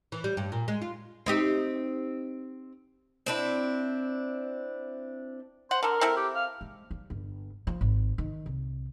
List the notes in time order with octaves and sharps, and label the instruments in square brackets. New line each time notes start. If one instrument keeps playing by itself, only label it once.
[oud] E3
G3
G2
A#2
G#3
F4
C4 D#4 G4
[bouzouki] C4 D4 E4
[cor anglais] C5 [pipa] F#5
[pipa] D3 A4 [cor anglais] A#4
[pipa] C4 E4 A4
[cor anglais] G4
F5
[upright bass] G#3
G3
G1
F3
G#1
D#3
C2